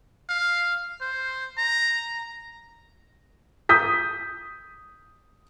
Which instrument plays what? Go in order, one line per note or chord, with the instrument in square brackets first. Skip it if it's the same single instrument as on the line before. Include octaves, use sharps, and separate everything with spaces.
[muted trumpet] F5
C5
A#5
[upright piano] D#6 G6 B6